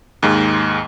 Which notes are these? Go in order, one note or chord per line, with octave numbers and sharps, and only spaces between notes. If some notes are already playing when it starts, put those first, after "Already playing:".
D#2 G#2 G#3